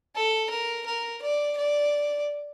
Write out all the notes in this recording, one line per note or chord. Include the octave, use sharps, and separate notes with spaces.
A4
A#4
A#4
D5
D5